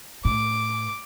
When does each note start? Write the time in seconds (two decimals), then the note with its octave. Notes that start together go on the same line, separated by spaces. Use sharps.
0.25 A2 D6